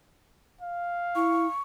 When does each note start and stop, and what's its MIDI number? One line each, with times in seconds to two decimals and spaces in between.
0.61 1.53 77
1.15 1.47 64
1.15 1.62 85